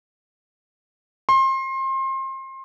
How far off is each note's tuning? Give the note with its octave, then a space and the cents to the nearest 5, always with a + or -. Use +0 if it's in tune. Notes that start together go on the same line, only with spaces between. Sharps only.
C6 +30